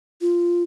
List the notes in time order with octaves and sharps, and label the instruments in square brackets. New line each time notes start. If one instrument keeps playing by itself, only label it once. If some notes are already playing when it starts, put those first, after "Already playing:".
[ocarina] F4